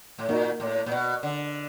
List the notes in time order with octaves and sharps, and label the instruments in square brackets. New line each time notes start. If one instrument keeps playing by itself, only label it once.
[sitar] A2
[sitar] A#2 [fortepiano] A#3 D#4 F#4 A#4
[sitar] A2
A#2
B2
D3